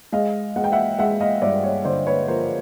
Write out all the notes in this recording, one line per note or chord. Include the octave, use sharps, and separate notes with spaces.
G#3 D#5 F5
G#3 F#5
G5
E5 F#5
G#3 E5 F#5
D#5 F5
G2 D5 E5
C#5 D#5
D3 C5 D5
B4 C#5
F3 A#4 C5